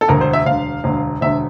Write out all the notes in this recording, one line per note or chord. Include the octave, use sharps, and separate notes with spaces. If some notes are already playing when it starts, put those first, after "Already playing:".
A4
E1 D2 D3 A#4
C5
E5
E1 D2 D3 F5
E1 D2 D3
E1 D2 D3 E5